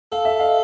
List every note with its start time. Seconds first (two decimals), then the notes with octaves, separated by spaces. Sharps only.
0.12 A4 F5
0.25 E5
0.39 D#5 F5